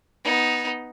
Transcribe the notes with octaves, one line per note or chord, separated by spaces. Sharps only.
B3 D#4